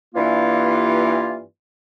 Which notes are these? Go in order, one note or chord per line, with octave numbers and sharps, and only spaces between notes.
G2 E3 A#3 F4